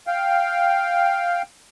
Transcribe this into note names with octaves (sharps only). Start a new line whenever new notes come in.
F5 G5